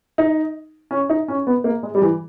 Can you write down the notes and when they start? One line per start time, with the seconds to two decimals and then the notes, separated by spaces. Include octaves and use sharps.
0.18 D#4
0.91 C#4
1.09 D#4
1.28 C#4
1.47 B3
1.64 A#3
1.83 G#3
1.95 G3
2.02 E3